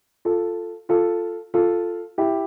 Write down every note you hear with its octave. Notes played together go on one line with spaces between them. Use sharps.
F4 A4
F4 A4
F4 A4
E4 G4